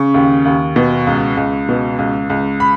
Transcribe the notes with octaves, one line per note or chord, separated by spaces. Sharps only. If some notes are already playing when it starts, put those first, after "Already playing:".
Already playing: C#3 C#6
D#2
D#2
B2
C#2
C#2
B2
C#2
C#2
B5